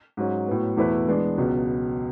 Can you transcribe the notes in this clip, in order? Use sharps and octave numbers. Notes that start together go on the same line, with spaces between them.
G#2 F#3 C#4
A2 F#3 B3
E2 B2 A3 E4 B4
E3 G#3 B3 D4
C#2 B2 F#3 B3